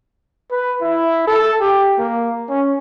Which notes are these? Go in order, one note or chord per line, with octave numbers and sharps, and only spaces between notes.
B4
E4
A4
G4
A#3
C#4